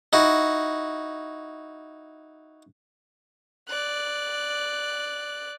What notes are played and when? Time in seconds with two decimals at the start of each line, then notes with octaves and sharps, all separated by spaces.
0.13 D#4 E4 F#4
3.69 D5 F#6